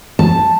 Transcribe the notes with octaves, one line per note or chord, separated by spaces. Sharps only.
A5